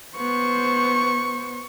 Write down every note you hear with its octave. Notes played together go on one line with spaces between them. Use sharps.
B3 C5 C#6